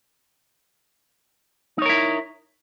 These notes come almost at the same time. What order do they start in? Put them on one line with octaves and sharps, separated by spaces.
D#4 C#5 A#4 E4